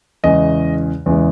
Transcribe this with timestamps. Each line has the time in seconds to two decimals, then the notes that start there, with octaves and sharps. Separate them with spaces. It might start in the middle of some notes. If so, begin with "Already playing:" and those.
0.24 E2 C#3 E3 G#3 D#5
1.06 E2 C#3 E3 G#3